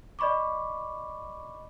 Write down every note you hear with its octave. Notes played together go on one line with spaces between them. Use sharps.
D5 D#5 B5 C#6 D6